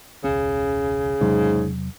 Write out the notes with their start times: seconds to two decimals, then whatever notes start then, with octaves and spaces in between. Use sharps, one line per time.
0.24 E1 C#2 C#3 C#4
1.20 E2 G#2 C3 F#3